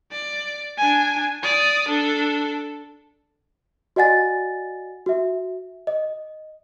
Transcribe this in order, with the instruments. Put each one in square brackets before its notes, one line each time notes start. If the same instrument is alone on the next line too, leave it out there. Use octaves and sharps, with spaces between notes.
[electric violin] D5
D4 G#5
D5 D#6
D4 A4
[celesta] F#4 D5 D#5 F#5 G#5 A6
F#4 E5
D#5